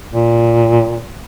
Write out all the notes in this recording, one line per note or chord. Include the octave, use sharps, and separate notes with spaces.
A#2